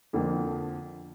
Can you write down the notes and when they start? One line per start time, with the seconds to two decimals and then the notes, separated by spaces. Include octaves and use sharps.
0.13 F2 D3 F3 A#3